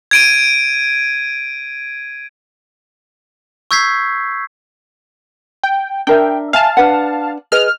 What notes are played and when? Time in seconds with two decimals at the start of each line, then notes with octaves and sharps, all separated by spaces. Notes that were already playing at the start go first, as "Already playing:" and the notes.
0.11 G#6 D7 D#7
3.71 C#6 E6 G6 G#6 B6 C7
5.64 G5
6.07 D4 A#4 E5 G5
6.53 E5 F5 G#5 A5
6.77 D4 B4 F#5
7.52 G#4 B4 D#5 F6